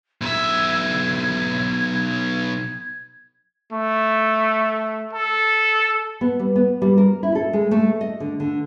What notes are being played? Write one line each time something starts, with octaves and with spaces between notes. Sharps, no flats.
B1 E5 G#6
A3
A4
B3
G3
B3
G3
A#4
E4
A4
G#3
A3
D#5
D3
D3